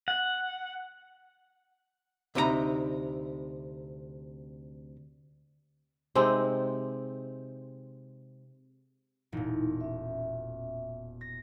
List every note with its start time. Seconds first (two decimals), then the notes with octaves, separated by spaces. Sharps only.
0.08 F#5
2.35 D2 C3 D#4 E4 A#5 B5
6.15 C3 G#3 C4 D#4
9.32 E1 A#2 D#4 E4
9.81 C#4 E5
11.21 A#6